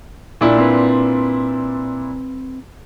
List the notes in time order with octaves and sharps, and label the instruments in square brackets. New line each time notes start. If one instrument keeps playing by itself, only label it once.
[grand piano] A#2 D4 E4
[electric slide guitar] C4 B4